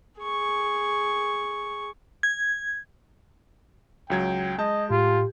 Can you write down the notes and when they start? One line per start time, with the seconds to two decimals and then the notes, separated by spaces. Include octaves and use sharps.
0.21 G#4 C#6
2.23 G#6
4.10 C#2 F#3 G5 G#6
4.58 G#3 D#5 A5 G6
4.90 A2 F4 G4